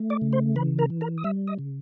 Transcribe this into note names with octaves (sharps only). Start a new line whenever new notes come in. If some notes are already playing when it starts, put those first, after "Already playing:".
Already playing: A3
D5 D6
C#3
C5 C6
E3 B4 B5
A#4 A#5
E3
A#4 A#5
D#6
G3 E5 E6
D#5 D#6
C#3